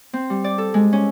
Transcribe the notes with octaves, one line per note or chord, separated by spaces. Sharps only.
C4
G3
D5
A4
G#3
C#4